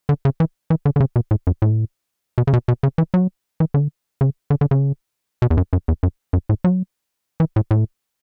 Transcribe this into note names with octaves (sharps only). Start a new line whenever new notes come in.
D3
C#3
E3
E3
D3
D3
C#3
B2
A2
F#2
A2
B2
C#3
B2
B2
C#3
E3
F#3
E3
D3
C#3
D3
D3
C#3
B2
E2
F#2
F#2
E2
F#2
F#2
A2
F#3
E3
A2
A2